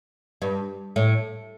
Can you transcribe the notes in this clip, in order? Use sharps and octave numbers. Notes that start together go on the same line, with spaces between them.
G2
A2